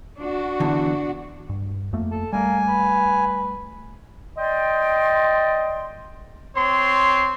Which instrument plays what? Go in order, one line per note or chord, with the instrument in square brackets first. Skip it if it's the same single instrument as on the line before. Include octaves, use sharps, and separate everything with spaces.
[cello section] D4 F#4
[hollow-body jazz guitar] E2 D3 E3
[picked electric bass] G2
F2 A3 A#3
[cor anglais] A4
[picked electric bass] G3 A3 [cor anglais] A#3 [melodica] G#5
[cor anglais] B4
[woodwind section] D5 D#5 G5 C6
[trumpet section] C4 C#5 C6